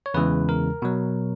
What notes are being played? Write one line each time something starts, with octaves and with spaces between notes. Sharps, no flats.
C#5
E2 C#3 E3 G#3 B4
A#4
B2 F#3